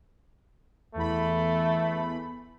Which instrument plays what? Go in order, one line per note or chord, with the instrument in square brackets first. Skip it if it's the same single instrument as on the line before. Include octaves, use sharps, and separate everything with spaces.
[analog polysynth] E2 E3 B5 [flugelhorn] A3